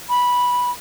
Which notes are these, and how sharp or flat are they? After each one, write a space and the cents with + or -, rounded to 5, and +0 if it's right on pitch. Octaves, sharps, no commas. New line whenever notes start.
B5 -10